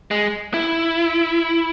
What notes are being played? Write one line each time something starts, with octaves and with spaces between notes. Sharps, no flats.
G#3
E4